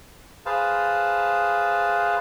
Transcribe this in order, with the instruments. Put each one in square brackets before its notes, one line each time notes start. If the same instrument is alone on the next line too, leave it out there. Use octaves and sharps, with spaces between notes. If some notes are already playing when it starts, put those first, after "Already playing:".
[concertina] G#4 B4 C5 F5 A5